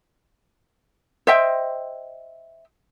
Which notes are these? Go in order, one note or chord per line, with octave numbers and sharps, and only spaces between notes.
C5 D#5 E5 G5